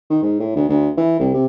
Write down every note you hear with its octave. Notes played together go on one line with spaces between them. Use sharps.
D#3
G#2
A2
D2
D2
E3
C2
C3